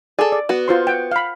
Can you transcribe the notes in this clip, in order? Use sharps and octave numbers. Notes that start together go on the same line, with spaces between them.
G#4 A4 D5
D5
B3 F#4
F4 C5 C6
F#5 G5
F5 B5